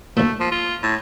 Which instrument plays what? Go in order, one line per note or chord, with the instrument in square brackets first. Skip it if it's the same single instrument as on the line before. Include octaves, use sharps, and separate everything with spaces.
[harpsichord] D2 A#2 [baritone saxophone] A3
[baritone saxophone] F3
F4
A2